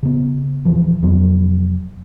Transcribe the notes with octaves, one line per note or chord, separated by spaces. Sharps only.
C#3 B3
D#1 E3 F3
F1 F2 F#3 B3